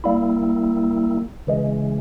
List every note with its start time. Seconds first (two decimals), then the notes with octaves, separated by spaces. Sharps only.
0.04 G3 A#3 E4
1.47 C#3 E3 G#3